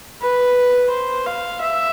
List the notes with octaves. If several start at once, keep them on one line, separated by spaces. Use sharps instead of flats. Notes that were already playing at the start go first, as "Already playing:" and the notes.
B4
C5
F5
E5